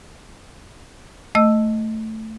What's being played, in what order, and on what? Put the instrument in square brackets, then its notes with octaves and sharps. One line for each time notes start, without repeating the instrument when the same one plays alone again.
[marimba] A3 D#5 E6